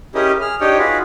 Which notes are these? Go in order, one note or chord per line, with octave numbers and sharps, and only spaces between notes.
C#4 E4 G4 G#4 A#4 D#5
G#4 F6
D4 D#4 G4 C#5 D#5 G5
D#4 F4 F#4 G#4 B4